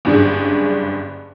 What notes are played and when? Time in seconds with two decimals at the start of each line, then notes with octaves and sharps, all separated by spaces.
0.05 F#1 G2 D3 G#4